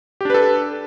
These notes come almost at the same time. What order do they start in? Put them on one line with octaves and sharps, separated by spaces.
G4 D4 B4 A4